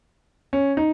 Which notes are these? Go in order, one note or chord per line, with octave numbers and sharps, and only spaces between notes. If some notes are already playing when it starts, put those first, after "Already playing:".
C#4
D#4